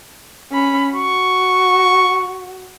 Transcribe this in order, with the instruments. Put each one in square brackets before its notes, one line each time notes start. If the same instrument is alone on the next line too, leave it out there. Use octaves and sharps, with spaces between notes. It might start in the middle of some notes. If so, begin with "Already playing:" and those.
[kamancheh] C#4 B5
[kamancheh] F#4 [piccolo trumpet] C#6